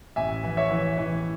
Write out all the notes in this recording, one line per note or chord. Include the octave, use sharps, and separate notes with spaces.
A1 E5 G#5
E3
C#5 E5
E3
E3